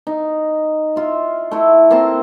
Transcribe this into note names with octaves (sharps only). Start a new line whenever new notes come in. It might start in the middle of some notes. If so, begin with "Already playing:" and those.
D#4
F4 E5
A3 E4
A#3 C4 A5 C6